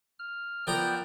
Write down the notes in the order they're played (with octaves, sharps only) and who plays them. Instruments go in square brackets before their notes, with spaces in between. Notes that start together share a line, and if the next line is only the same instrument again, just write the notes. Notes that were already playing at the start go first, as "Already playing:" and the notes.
[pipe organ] F6
[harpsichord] F3 A#4 A#5 [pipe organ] B3 D5 G5